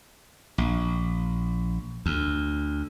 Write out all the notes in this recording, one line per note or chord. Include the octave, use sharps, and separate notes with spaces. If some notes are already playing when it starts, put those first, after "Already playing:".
A#1
D2